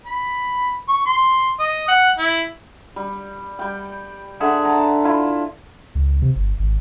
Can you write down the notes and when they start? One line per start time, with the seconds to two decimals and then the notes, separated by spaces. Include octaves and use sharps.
0.05 B5
0.89 C#6
1.06 C6
1.60 D#5
1.88 F#5
2.18 E4
2.96 G3
3.59 G3 G5
4.40 D3 G#4 E5 F#5
4.65 A5 A#5
5.04 E4 F4
5.95 C#2
6.22 C3
6.36 G1
6.59 G#1